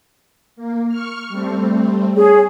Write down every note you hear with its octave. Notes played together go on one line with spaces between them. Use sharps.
A#3
C#6 F6
G3 A3 C4
G#4 C#5